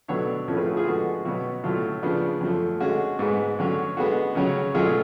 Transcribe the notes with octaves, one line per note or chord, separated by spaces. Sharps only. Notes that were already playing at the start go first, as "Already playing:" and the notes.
B2 F#3 B3 D4 A4 C#5
A2 F3 A3 C#4 A4 C#5
G#4 B4
F#4 A4
F4 G#4
D3 F3 G#3 B3 F#4
B2 F#3 B3
A2 F#3 A3 F4
C#3 F3 B3 D4
F#2 F3 A3
D3 G#3 C#4 F#4
G#2 G#3 B3
D3 F#3 C#4
D3 G#3 B3 F#4
C#3 F#3 C#4
B2 F#3 A3 F4 G#4